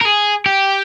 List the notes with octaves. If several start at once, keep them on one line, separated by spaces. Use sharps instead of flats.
A#4
G#4
G4